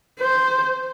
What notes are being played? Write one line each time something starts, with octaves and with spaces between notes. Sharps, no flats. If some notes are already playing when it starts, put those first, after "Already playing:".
C5